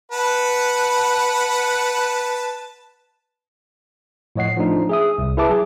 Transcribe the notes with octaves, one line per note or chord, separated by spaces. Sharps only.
B4 F#5 A5
A2 F3 C#5 D#5 F#5 C7
F3 A3 D4 D#4
G#4 E5 D#6
C2
E4 G#4 B4 E5 A5 D6
F#3 G#4